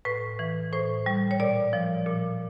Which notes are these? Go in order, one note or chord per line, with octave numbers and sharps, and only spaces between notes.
A2 B4
E3
A2 C5
G3
C#5
A#2 D5
F3
A#2